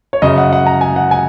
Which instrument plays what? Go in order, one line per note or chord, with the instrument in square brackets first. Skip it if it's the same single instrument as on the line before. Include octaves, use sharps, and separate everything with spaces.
[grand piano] C#5
F#2 C#3 D#5
F#5
F#5
A#5
G#5
F#5
G#5